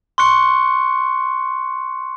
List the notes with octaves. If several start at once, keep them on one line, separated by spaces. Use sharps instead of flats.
C6 C#6 F#6 C#7